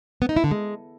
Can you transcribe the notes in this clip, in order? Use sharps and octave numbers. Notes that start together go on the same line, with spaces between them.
B3
D#4
E4
D3
G#3